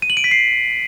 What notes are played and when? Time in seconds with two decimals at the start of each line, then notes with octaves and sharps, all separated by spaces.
0.02 D#7
0.10 F#7
0.17 D7
0.24 B6
0.31 C7